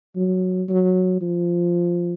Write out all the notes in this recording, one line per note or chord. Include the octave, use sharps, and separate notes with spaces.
F#3
F#3
F3